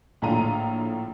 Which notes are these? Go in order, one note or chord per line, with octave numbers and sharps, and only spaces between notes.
A#1 A2 D3 F4 A#5 D#7